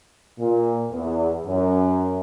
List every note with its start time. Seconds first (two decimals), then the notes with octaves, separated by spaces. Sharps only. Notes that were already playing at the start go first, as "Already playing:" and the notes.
0.38 A#2
0.91 E2
1.45 F#2